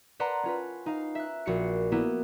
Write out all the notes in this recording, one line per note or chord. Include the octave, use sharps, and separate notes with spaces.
B4 D5 F#5 A5 A#5 C6
C#4 F4 B4
D#4 F5
E5 F#6
A#1 F#4 C7 C#7
A#3 B3 E4